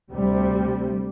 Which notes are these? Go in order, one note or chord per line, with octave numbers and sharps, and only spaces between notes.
D2 C3 G3